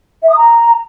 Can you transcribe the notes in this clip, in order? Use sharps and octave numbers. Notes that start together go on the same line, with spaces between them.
E5
D#6
A#5